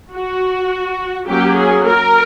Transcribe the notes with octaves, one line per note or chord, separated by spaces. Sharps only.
F#4
F#3 A#3 C#4 G4
G#4
A#4